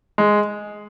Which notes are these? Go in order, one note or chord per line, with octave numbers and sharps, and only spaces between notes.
G#3